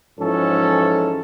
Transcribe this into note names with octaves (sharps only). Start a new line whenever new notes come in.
G#2 E3 F3 C#4 A4